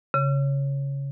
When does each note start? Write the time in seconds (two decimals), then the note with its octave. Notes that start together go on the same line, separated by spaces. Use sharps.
0.14 C#3